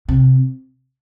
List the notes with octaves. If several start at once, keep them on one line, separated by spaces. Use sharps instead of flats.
C3